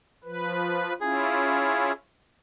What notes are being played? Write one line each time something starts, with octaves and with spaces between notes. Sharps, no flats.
F3 B4
C#4 E4 F4 G#4